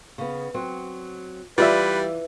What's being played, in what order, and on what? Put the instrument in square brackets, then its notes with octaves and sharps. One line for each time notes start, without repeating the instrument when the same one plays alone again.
[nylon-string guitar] C#3 B3
F#3 C4
[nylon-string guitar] E3 [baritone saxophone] G3 [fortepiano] F4 D5 E5 [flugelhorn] B4